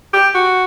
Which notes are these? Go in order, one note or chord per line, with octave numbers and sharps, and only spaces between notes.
G4
F#4